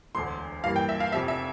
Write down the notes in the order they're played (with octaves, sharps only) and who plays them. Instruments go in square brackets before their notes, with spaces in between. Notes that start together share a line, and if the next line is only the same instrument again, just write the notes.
[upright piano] E1 D2 D3 C6
G2 E3 A#3 F5
G5
E5
F5
F1 F2 C3 F3 E5
E5